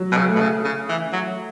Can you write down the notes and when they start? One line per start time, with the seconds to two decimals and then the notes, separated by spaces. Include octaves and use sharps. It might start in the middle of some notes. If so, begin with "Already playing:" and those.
Already playing: F#3
0.12 B2
0.17 C#3
0.28 A3
0.35 B2
0.40 C#3
0.64 C#3
0.89 E3
1.12 F#3